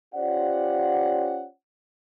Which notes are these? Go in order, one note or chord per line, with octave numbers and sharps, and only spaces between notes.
C#4 F4 G4 C5 D5 F#5